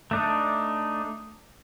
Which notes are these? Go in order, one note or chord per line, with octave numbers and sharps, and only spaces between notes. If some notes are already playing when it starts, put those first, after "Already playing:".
A3 D4 D#4